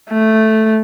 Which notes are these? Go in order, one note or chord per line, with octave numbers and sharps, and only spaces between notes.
A3